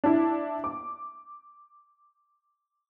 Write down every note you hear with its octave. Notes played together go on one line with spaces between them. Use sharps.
D4 E4
D6